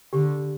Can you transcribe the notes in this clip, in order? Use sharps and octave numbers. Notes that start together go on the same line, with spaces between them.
D3 G4